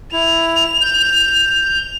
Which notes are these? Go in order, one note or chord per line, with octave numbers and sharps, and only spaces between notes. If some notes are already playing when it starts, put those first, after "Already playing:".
E4 F7
G6